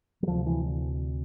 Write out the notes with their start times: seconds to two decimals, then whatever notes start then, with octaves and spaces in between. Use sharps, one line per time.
0.23 F#3
0.28 D2 C3 F3
0.46 E3